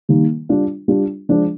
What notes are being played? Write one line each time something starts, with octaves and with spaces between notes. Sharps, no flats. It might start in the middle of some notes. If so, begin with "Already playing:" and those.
D#3 G3 A#3
G3 D4 F4
G3 D4 F4
F3 G#3 D4